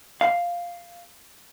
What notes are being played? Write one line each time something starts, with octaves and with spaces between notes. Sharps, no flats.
F5